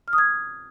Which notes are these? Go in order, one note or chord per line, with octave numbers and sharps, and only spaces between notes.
F6
D#6
G#6